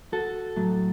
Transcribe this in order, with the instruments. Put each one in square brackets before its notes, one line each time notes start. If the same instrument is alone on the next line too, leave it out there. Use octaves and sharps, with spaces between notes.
[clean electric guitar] F#4 A4
A2 F#3